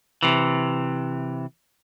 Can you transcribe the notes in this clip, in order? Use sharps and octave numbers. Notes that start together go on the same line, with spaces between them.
C3 E3